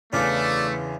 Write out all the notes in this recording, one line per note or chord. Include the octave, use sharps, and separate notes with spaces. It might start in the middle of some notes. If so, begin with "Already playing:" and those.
E2 C#3 E3 A3 D4 F4 D5